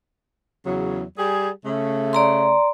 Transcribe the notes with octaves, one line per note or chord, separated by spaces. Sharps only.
E2 C#3 F#3
G3 G4 G#4
C#3 A3
D5 A#5 C6